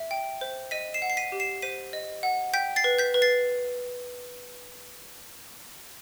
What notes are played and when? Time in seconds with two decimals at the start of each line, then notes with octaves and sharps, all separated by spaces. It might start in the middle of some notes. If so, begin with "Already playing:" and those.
Already playing: E5
0.11 G5
0.41 C5
0.71 D#5 B6 D#7
0.94 C7 E7
1.02 F#5
1.10 C7
1.17 B6 D#7
1.32 G4
1.40 C7 E7
1.62 C5 B6 D#7
1.93 D#5
2.23 F#5
2.54 G5 G6 B6
2.76 A6 C7
2.84 B4
2.99 G6 B6
3.14 B4
3.22 A6 C7